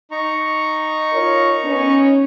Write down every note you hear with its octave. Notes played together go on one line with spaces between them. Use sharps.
D#4 A#5 C#6
F4 A#4 C#5
B3 C#4